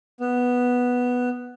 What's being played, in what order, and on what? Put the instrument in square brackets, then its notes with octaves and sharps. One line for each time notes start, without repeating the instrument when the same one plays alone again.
[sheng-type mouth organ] B3